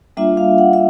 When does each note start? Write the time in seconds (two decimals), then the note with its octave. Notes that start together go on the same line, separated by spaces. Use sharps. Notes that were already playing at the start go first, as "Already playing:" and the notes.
0.17 G3 A#3 D4 F4 E5
0.37 F5
0.58 F#5
0.73 E5